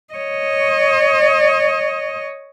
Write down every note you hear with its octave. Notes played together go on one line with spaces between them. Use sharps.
C#5 D#5